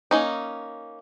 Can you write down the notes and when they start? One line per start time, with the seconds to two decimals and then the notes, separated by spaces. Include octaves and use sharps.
0.11 A#3 C#4 D#4